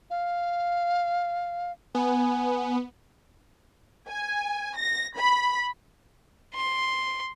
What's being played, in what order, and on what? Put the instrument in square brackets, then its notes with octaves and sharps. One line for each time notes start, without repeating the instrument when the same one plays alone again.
[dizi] F5
[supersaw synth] B3 [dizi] G#5
[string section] G#5
A#6
B5
[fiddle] C6